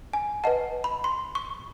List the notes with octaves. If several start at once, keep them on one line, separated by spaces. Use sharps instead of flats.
G#5
B4 D#5 F#5 A5
B5
C6
C#6